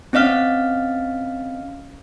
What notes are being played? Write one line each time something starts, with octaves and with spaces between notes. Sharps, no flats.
C4 C#4 D#5 F5 F6